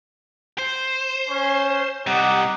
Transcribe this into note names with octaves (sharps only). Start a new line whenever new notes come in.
C5
C#4
C3 G3 D#4 G4 F#5